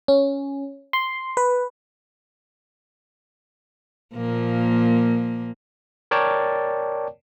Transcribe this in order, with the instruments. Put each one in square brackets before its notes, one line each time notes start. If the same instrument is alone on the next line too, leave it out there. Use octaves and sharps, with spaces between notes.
[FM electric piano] C#4
C6
B4
[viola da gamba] A#2 F3 A#3
[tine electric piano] A#4 C#5 D5 G5 A5